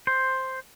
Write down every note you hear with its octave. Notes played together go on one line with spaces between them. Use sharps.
C5